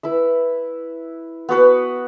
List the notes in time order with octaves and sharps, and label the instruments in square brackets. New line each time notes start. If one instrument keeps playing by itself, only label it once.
[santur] E4 B4 E5
B3 F#4 B4